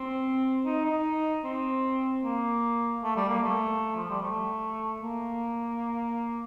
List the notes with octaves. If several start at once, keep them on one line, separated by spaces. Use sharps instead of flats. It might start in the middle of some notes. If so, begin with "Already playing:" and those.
Already playing: C4
D#4
D#4
C4
A#3
A3
G3
A#3
A3
F3
G3
A3
A#3